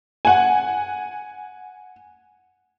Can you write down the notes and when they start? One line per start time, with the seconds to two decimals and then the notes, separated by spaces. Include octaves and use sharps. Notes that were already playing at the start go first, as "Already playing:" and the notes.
0.25 F#5 G#5